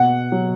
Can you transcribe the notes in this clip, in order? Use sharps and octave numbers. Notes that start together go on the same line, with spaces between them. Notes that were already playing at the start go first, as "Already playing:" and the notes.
Already playing: B2 F#5
F#3